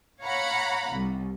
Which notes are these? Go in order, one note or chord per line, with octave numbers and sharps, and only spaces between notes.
C#5 F5 F#5 A#5 B5
C2